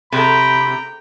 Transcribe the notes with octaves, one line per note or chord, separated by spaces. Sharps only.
C3 G#4 A4 G5 A#5 B5